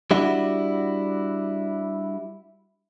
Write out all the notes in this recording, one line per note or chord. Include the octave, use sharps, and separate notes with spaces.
G3 D4 E4 F#4